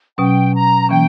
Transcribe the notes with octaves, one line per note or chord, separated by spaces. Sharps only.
B2 F#3 C#4 G5
A#5
E3 A#3 C#4 G5